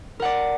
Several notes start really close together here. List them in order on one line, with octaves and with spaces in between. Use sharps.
A#4 F#5 D5